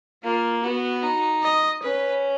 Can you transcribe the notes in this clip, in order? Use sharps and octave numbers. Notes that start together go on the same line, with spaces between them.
A#3 F4
B3 F#4
D#4
D#5
C#4 B4